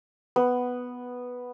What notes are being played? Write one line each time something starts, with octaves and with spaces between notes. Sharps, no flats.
B3